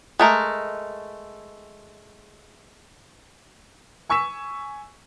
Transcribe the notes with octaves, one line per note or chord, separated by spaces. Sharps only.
G#3 A3 A#4
G#5 C#6 E6 B6 E7